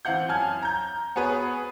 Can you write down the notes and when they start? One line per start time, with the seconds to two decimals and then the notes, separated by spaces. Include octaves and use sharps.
0.05 E3 C4 F5 F#5 G6
0.29 F#2 G#5 A5 F6 G#6
0.63 A#5 G6
1.16 B3 F#4 G#4 B4 C#5